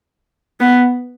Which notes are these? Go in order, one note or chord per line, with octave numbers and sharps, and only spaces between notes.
B3